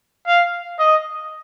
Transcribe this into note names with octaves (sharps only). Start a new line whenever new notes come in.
F5
D#5